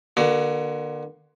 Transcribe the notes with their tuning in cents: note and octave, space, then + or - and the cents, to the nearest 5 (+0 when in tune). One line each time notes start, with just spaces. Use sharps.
D3 +30 A#3 +45 F#4 +35